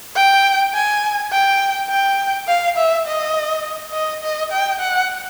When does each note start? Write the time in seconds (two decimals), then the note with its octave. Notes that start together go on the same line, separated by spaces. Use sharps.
0.16 G5
0.74 G#5
1.32 G5
1.90 G5
2.48 F5
2.77 E5
3.07 D#5
3.93 D#5
4.23 D#5
4.52 G5
4.80 F#5